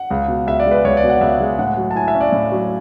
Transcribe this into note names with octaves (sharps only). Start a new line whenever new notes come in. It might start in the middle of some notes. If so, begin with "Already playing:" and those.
Already playing: F#5
C#2
B2
C#2 E5
D5
G#3
B4
C#2 C#5
D5
B2
F#5
C#2 E5
G#3
A2 F#5
F#3
A5
E4 G#5
E5
C#4
D5
A2
F#3